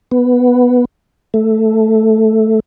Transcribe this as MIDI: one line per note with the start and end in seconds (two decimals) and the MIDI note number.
0.11 0.85 59
1.34 2.60 57